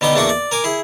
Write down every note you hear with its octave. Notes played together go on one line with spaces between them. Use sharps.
B2 D3 B3 D#4 G5
E2 A3 A#3 D4 F#4 C#6
D5
A#4 G#5 D6
E4 G#4